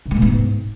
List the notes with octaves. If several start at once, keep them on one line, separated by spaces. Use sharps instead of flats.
C3
G#3
B2
B3
G#2